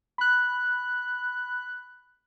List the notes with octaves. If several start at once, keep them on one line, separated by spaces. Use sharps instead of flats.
B5 F#6